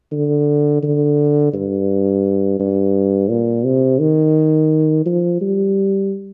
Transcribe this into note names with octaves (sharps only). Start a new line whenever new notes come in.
D3
D3
G2
G2
A#2
C3
D#3
F3
G3